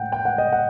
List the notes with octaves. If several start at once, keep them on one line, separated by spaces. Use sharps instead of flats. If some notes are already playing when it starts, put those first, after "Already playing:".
Already playing: A2 F#5 G5
G5
F#5
D#5
F#5